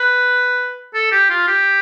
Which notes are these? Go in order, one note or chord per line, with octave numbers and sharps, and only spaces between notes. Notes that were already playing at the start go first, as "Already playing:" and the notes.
Already playing: B4
A4
G4
F4
G4